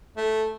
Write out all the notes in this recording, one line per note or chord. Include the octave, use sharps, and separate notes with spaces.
A3